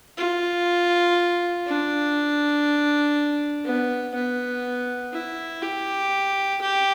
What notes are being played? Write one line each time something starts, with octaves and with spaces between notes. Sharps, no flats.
F4
D4
B3
B3
E4
G4
G4